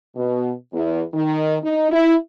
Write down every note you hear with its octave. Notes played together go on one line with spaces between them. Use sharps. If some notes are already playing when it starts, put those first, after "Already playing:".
B2
E2
D#3
D#4
E4